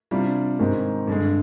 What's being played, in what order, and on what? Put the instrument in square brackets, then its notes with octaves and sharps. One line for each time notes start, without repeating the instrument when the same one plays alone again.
[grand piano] C3 G3 D4 F4
G#2 D#3 G#3 C4 G4
G2 D3 G#3